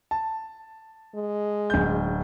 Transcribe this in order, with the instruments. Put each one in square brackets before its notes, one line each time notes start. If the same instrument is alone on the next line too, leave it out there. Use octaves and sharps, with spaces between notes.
[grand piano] A5
[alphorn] G#3
[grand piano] D1 G6